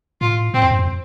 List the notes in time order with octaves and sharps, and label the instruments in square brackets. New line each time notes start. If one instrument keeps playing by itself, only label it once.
[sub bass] A2 [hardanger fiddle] F4
[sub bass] A2 [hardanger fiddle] C4
[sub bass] F2
G2
F2